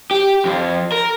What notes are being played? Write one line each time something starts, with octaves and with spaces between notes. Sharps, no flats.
G4
F2
A#4